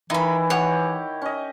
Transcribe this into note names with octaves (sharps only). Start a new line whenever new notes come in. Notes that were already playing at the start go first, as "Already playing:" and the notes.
D#3 E3 D#4 E4 B5
G4 C#5 F#5
C#4 D#5